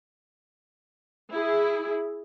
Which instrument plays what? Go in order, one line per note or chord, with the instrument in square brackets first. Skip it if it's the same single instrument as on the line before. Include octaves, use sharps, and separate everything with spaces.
[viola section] E4 G#4